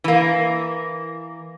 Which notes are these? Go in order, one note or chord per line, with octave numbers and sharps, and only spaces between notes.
E3 A#3